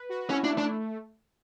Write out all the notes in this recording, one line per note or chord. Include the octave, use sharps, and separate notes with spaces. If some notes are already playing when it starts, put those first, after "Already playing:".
Already playing: B4
F#4
C#4 E4
D4
A3
D4